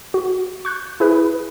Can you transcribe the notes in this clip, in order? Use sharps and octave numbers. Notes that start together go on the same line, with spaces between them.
F#4
C#6 F#6 G6
E4 G#4 B4